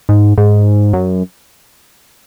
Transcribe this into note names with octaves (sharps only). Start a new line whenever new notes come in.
G#2
G#2
F#2